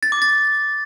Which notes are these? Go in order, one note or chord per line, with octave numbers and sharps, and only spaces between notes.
A6
D6
A6